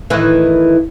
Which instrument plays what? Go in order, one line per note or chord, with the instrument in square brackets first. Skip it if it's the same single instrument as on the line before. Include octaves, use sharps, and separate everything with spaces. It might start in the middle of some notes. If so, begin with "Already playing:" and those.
[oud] A2 D#3 E3